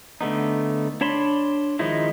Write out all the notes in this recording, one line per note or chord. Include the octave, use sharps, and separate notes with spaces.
D3 A3 B3 D#4
D4 C#5 A5 B5 C6
D#3 F3 G#3 D#4 E4